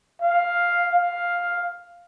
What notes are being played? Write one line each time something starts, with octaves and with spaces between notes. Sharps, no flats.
F5
F5